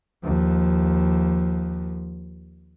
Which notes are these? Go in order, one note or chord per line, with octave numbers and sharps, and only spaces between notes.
D#2 F3